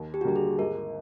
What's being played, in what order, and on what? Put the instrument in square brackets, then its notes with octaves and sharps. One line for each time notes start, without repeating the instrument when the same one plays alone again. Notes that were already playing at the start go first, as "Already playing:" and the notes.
Already playing: [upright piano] D#2
[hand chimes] G4
F#4
[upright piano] D3 G3 A#3 [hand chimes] G4
[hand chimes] G#4
[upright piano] G#1 [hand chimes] A#4